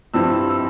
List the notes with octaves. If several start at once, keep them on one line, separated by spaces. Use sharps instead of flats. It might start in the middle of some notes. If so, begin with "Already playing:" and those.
G2 F3 C4 E4 E6
E6